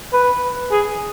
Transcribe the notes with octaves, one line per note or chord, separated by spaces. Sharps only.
B4
G#4